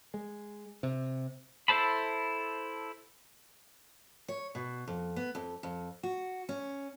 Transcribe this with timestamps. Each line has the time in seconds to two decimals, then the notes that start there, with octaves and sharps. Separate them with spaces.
0.14 G#3
0.83 C3
1.68 E4 A4 C5 A5 B5
4.28 C#5
4.55 B2
4.87 F2
5.16 B3
5.35 F2
5.63 F2
6.03 F#4
6.49 C#4